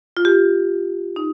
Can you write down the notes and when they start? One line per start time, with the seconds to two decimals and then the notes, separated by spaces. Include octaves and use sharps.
0.17 F4
0.25 G4
1.16 D#4